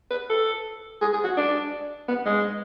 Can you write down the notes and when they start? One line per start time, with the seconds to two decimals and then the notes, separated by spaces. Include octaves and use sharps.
0.11 B4
0.29 A4
1.01 G#4
1.13 G#4
1.24 F#4
1.37 D4
2.09 B3
2.26 G#3